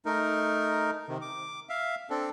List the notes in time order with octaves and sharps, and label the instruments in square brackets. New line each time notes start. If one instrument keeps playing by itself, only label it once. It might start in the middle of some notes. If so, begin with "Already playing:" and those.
[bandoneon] A3 D#4 A#4
C3 D#3
D6
E5 F5
C4 D4 A4